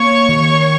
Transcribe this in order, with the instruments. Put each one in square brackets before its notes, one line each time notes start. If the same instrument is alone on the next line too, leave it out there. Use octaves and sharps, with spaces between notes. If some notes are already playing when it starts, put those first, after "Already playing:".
Already playing: [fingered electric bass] A#3 [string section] C#5 C#6
[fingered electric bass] D#3